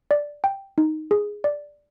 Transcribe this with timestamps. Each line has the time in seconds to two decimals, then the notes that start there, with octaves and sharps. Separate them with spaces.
0.11 D5
0.44 G5
0.78 D#4
1.11 G#4
1.44 D5